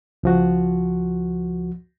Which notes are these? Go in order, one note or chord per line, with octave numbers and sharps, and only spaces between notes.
C#2 F3 F#4